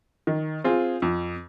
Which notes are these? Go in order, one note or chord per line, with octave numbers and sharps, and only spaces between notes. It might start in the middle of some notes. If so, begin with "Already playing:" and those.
D#3
C4 F4 G#4
F2